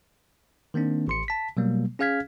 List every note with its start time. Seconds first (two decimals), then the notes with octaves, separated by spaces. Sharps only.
0.74 D#3 A#3 C4 D4
1.08 A1 C6 C#7
1.28 A5 B6
1.57 B2 F#3 G3 A#3
1.99 C#4 G#4 F5 F6 G#6 B6